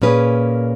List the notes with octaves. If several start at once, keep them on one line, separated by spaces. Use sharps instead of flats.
A#2 A#3 C#4 G#4 B4